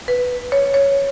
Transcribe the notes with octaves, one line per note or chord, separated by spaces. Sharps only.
B4
C#5
C#5